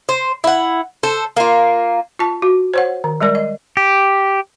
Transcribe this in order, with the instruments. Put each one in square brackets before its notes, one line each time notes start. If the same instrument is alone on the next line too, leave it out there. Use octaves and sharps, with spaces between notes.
[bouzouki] C5
E4 F#5
A4 C5
A#3 F4
[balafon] F4 A5
F#4
C5 C#5 F#5
D#3
G3 G#3 A#4 D5
D#5
[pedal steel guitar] G4